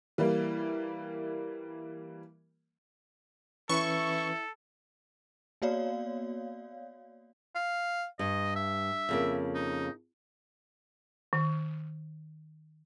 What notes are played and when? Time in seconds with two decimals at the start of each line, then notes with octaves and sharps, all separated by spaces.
0.18 E3 G3 A#3
3.69 E3 C#4 E4 A4 B4 C#6
5.62 A#3 B3 F#4 C#5 D5 F5
7.56 F5
8.19 G2 D#5
8.56 E5
9.09 F2 C#3 A#3
9.54 D#4
11.33 D#3